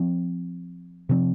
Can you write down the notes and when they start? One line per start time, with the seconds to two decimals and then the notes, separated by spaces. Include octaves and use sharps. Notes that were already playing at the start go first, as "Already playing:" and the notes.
Already playing: F3 C4
1.09 C3 F3 C4